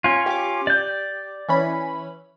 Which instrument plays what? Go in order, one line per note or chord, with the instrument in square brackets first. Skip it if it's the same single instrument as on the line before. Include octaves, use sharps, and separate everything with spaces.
[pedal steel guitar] C#4 F4
[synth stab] G4 D6
[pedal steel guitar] D5 G6
[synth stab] E3 C#4 B5